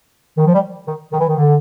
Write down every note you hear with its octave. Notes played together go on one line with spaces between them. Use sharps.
D#3
F3
G3
D#3
D#3
E3
D#3
D3